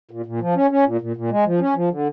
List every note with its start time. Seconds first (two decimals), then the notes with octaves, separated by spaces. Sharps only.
0.11 A#2
0.26 A#2
0.41 F3
0.56 C#4
0.71 C#4
0.86 A#2
1.01 A#2
1.16 A#2
1.31 G#3
1.46 F3
1.60 C#4
1.75 F3
1.91 D3